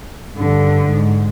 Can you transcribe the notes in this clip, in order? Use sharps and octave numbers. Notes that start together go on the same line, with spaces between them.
G2 D3
G#2